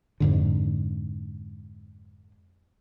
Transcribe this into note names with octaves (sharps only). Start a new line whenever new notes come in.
F2 G#2 D3